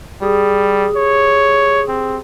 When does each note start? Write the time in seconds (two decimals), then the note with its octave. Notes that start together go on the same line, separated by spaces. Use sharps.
0.22 G3 G4 G#4 D#6
0.96 C#5
1.89 C4